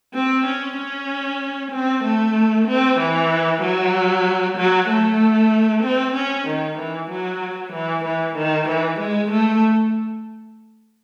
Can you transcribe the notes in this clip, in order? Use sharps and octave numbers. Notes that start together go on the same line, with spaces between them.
C4
C#4
C#4
C4
A3
C4
E3
F#3
F#3
A3
C4
C#4
D#3
E3
F#3
E3
E3
D#3
E3
G#3
A3